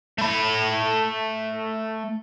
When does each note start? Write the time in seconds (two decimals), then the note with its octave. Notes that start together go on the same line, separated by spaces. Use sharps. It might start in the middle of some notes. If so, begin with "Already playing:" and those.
0.18 A3 B5